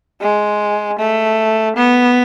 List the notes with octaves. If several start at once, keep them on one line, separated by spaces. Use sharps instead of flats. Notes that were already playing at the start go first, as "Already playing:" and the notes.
G#3
A3
B3